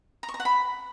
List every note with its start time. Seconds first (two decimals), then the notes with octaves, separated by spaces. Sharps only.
0.23 A#5
0.29 C#6
0.34 A#5
0.40 F#5
0.45 B5